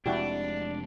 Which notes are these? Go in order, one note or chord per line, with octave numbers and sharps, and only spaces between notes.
F1 C3 G#3 D4 E4 F#4 G4 D5